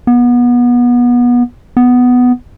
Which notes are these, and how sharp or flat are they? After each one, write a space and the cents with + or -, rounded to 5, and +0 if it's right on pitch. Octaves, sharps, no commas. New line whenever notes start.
B3 -25
B3 +5